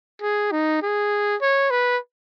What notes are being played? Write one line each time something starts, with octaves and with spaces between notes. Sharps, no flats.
G#4
D#4
G#4
C#5
B4